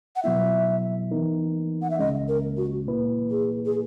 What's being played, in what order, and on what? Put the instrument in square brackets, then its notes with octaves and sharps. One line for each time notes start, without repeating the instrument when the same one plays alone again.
[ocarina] F#5
[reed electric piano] B2 F#3 B3 E4 [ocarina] E5
[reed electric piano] E3 B3 D#4 A#4
[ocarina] F#5
E5
[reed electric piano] C#2 C#3 G#3 C#4 [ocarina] D#5
[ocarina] A#4
F#4
[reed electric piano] A#2 A#3 E4 B4
[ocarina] G#4
G#4